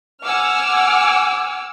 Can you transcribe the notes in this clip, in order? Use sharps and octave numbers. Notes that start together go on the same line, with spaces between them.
F#5 G#5 D6 E6 F6